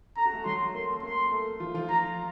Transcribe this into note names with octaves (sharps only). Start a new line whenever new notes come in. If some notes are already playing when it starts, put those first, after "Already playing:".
A4 A#5
F#4
A3 A4
F#3 F#4 C6
A#3 A#4 C6
A4
A#3 A#4 C6
A3 A4
F3 F4
F3 F4
A#5